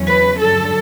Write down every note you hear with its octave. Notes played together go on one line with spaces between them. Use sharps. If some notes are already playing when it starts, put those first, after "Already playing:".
Already playing: E2 C#3 F#3 C#4
B4
G2 D3 F#3 A4